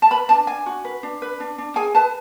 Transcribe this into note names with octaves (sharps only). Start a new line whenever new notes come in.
A5
B4 B5
D4 A5
D4 G#5
F#4
B4
D4
B4
D4
D4
G#4 G#5
B4 A5